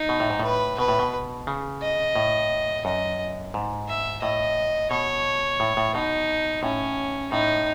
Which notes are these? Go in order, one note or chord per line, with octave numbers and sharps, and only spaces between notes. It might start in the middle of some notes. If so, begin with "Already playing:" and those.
Already playing: D#4
B2
A2
G#2
A2 B4
B2 B4
A2
B2
C#3
D#5
A2
F#2 D#5
G#2
E5
A2 D#5
B2 C#5
A2
A2
B2 D#4
A2 C#4
A2 D#4